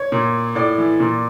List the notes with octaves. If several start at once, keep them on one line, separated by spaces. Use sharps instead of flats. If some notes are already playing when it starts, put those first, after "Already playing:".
Already playing: C#5
A#2
A2 D5
E3
A#2